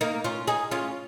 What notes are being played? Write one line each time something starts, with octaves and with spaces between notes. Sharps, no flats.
A#3 D#4
C#4 F4
D#4 G#4
C#4 F4